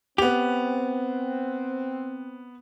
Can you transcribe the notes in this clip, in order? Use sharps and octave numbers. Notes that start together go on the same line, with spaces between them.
B3 C4 G4 F7